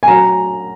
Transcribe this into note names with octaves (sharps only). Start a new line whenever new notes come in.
G#5
F#3 A#5